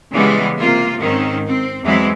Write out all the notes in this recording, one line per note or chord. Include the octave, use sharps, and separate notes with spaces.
C#3 E3 G3 G#3 B3
C3 A#3 F4
G#2 D#3 C4 C#4
C4
E2 E3 F#3 G#3 C4 E4